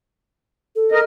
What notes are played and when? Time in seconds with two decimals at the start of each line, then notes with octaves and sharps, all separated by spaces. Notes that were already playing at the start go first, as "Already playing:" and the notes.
0.76 A4
0.92 A#4 D#5